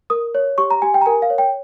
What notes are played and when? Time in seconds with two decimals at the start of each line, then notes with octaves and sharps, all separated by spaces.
0.10 A#4 D#6
0.35 C#5
0.58 G4 C#6
0.71 A#5
0.82 G4 G#5
0.94 G5
1.01 A#5
1.06 A#4 G#5
1.22 F5
1.30 C#5
1.38 G5